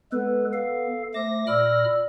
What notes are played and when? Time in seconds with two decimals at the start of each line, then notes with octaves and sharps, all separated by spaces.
0.12 G#3 B3 A4 B4
0.53 A4 F5
1.14 A3 C5 E5 D6 A#6
1.47 A#2 D5 B5 E6 F6